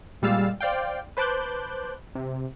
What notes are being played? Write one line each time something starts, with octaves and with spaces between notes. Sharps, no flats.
A#2 G3 G#3 F5 E6 A6
C5 D5 F5 G5
B4 C5 A5 D6 F#6 G6
C3